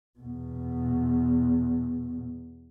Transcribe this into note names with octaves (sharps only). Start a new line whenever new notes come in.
E2 B2